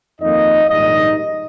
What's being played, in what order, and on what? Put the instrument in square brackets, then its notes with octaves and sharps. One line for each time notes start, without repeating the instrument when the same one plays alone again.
[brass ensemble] F2 D#3 A#3 D#4 D#5
A#1 G#2 D#3 G3 D#4 D#5